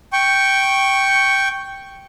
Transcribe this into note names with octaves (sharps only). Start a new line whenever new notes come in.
G5 C#6